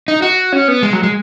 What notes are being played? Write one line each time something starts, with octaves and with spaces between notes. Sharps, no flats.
D#4
F#4
C#4
B3
G#3
F#3
G#3